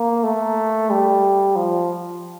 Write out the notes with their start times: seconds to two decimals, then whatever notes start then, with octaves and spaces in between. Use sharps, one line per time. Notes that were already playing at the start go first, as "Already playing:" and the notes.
Already playing: A#3
0.24 A3
0.90 G3
1.56 F3